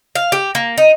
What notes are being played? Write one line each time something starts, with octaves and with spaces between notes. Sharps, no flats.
F5
G4
A#3
D#4